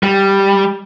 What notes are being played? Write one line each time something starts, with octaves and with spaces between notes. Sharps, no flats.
G3